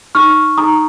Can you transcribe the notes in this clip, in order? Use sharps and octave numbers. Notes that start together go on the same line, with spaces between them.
D#4 C#6 F6
D#4 A#5 D#6